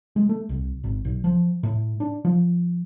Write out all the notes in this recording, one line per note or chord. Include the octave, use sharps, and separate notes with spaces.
G#3
A3
C2
G#1
B1
F3
A2
D4
F3